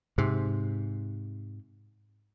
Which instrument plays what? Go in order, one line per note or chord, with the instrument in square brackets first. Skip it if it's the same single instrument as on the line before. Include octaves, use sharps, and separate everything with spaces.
[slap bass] G#2 C3